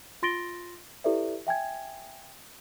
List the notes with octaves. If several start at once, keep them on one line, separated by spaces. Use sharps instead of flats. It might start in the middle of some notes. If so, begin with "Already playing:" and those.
F4 C6 A6 A#6 D7 G7
E4 G4 A4 B4 D5 E5
E5 G5 G#5 G#6